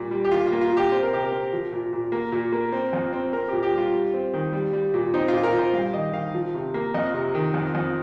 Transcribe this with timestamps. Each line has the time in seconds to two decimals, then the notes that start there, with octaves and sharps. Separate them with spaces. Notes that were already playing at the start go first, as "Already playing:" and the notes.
Already playing: A#2 G3
0.11 G3
0.25 G4
0.31 A#2 F4
0.47 F4
0.52 A#3
0.61 F4
0.72 A#2 G4
0.92 C4 C5
1.03 A#4
1.13 C3 G4
1.23 A#4
1.32 C4
1.53 F3
1.72 A#2
1.93 A#2
2.12 A#3
2.32 A#2
2.52 A#3
2.72 C4
2.93 F2
3.13 C4
3.33 C4 A#4
3.48 A#2 G4
3.63 G4
3.73 G3 F4
3.93 G3
4.14 C4
4.33 D#3
4.53 G3
4.73 G3
4.94 A#2
5.14 C4 D#4
5.28 F4
5.33 A#2
5.43 A#4
5.53 A#2
5.58 C5
5.73 G2 F5
5.93 D#3 D#5
6.13 D#3 F5
6.34 F3
6.54 C3
6.74 A#3
6.94 F2 D#5
7.14 C3
7.34 D#3
7.54 F2
7.75 F2